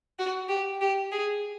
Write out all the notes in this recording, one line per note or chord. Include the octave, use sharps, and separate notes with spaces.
F#4
G4
G4
G#4